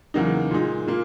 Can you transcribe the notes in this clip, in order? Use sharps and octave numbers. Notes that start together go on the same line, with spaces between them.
E2 C#3 F#3 A#3 D#4
A#2 G#3 D#4
A#2 A#3